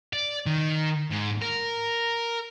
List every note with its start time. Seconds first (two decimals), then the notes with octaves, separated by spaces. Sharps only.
0.13 D5
0.46 D#3
1.11 G#2
1.42 A#4